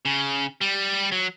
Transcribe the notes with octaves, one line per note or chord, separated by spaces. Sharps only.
C#3
G3
F#3